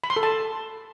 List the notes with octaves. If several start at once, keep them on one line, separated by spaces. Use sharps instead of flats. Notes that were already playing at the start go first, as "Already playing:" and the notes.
B5
C6
A4
A5